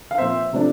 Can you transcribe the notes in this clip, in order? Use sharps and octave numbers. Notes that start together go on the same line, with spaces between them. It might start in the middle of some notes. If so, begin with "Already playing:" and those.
F5
A#2 F3 C4 C5 E5
C3 F3 A3 D4